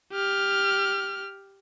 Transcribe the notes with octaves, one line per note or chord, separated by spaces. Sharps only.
G4 F6